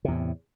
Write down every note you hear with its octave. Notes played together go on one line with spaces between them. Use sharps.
E2 A2 C3